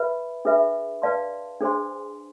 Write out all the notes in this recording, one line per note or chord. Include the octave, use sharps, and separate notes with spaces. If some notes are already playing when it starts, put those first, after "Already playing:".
Already playing: B4 E5 B5
D4 G#4 B4 E5 B5
B4 D5 F5 A5 C6
D4 G#4 C5 G#5 C6